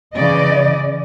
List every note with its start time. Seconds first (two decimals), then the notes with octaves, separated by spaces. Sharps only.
0.16 C#3 E3 D5 D#5